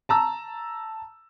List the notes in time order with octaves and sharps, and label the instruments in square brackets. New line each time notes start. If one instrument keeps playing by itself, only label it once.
[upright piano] A5 A#5 E6